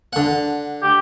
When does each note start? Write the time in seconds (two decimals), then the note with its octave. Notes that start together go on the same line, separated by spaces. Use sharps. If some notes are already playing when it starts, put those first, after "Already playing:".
0.13 D3 F#5
0.83 G4